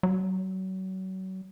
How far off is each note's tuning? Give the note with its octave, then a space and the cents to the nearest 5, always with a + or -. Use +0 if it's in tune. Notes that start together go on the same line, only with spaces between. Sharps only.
F#3 +30